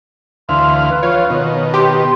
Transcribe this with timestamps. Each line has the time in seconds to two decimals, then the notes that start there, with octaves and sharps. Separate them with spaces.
0.49 D2 E3 F5 C6
0.90 B4
1.03 F3 F4 C#5
1.30 B2 D#3
1.74 G4 C6